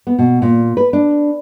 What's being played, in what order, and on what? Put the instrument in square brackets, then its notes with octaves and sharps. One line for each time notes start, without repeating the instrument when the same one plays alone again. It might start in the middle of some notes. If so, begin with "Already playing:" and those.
[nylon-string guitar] B3
B2
A#2
B4
D4